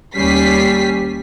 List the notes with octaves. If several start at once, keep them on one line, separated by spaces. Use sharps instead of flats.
D#2 G3 C#4 B6 C7